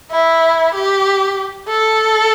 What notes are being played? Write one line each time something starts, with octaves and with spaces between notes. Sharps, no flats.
E4
G4
A4